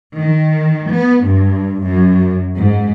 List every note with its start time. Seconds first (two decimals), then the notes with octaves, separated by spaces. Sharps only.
0.16 D#3
0.90 B3
1.23 G2
1.83 F#2
2.58 G#2